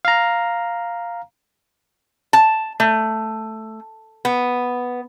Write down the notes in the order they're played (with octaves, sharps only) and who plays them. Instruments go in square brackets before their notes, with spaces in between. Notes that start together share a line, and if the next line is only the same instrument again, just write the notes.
[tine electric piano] F5 A#5
[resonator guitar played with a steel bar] A5
A3
B3